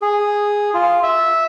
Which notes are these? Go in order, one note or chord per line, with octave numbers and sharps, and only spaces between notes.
G#4
F4
E5